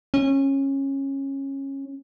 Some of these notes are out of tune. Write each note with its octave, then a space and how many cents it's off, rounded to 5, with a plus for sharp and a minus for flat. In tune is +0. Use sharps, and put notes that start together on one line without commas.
C#4 -20